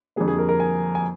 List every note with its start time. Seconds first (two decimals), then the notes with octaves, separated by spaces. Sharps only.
0.16 F2 D3 G3 A#3 G#4
0.28 G#4
0.38 A#4
0.49 A#4
0.60 G#5
0.95 G#5